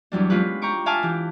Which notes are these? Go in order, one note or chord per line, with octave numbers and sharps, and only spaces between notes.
E2 F#3 G3 D4
G#3 B3 C#4 F4 G4 B4
G5 A#5 C#6 D6
E5 F5 G#5 A5 D6 F6
E3 G4